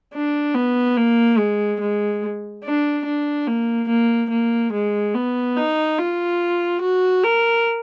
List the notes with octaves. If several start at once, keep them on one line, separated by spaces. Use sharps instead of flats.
D4
B3
A#3
G#3
G#3
D4
D4
A#3
A#3
A#3
G#3
B3
D#4
F4
F#4
A#4